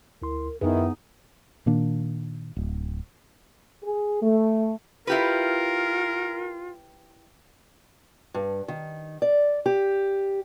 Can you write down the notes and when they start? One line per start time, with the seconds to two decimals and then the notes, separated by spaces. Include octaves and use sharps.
0.22 D2 E4 A#4 C6
0.61 F#2 D#3 B3 D#4 E4 G#4 B4
1.66 A#2 D#3 A#3 D4
2.56 D1
3.84 G#4
4.22 A3
5.07 E4 F4 G4 A#4 B4
8.34 G2
8.68 D#3
9.22 D5
9.66 G4